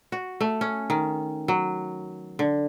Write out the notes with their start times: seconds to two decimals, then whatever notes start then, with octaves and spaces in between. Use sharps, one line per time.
0.12 F#4
0.41 A3
0.61 C#4
0.90 D#3
1.48 F#3
2.39 D3